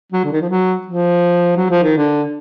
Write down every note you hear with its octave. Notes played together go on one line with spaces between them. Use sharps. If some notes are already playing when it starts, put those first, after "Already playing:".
F#3
D3
D#3
F3
F#3
F3
F#3
F3
D#3
D3